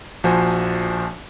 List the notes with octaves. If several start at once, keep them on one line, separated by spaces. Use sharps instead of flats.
A#1 F3 F#4 C5 G#5 A5